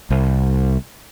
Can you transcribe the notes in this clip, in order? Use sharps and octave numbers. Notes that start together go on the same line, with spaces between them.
C2